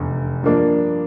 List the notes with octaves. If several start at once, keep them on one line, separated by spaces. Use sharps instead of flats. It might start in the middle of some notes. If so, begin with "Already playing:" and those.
Already playing: F1 E2 D3
G2 F3 A#3 D4